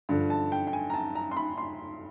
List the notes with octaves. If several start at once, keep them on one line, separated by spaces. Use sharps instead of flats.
G2 D3 F3
A5
G5
G5
G#5
A#5
A5
A#5
C6
B5
C6